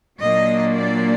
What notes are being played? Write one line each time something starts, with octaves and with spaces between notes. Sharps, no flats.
A#2 F#3 A#3 D4 D#5
D5